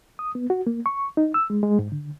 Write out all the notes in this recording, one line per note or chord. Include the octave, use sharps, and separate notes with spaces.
D#6
B3
F#4
A#3
C#6
D#4
E6
G#3
G#3
G#2
D3